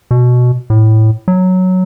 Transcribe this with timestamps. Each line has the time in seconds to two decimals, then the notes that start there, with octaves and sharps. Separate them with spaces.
0.11 B2
0.70 A2
1.28 F#3